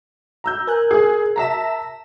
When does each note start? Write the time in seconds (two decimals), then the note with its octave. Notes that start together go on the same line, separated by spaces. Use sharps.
0.44 A#5 E6 G6
0.67 A#4 G#5 F#6
0.91 G#4
1.36 E5 A5 A#5 A#6 B6 E7